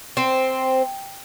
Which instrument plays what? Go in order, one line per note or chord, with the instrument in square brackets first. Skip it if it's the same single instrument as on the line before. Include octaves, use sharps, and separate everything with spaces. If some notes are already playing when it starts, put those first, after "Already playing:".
[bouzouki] C4